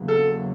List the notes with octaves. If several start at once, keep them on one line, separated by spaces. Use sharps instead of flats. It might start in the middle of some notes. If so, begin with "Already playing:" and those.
Already playing: E2 C#3 F#3 A#3
A4